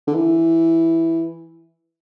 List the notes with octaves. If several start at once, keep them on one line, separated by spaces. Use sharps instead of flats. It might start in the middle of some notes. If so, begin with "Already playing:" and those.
D3
E3